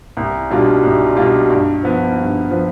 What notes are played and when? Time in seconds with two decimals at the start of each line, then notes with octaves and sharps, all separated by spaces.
0.17 C2
0.50 B2 G3 D4 F4
0.83 C2
1.16 B2 G3 D4 F4
1.50 G2
1.83 F3 B3
2.17 G2
2.50 F3 B3